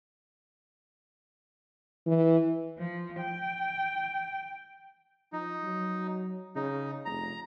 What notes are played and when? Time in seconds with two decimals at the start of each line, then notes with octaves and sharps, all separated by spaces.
2.07 E3
2.79 F3
3.20 G5
5.33 F3 D#4
5.64 F#3
6.56 C#3 D#4
7.05 F1 A#5